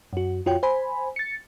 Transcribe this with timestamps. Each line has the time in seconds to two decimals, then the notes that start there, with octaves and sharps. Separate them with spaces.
0.13 F#2 F#4
0.46 F2 F4 F#4 C#5 G5
0.63 C5 G#5 B5
1.16 A6 C#7